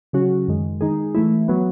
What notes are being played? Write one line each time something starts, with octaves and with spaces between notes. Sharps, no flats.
C#3 F#3 C#4 F#4
F#2 D#3 G#3
D#3 G#3 D#4 G#4
E3 A3 E4
F#3 B3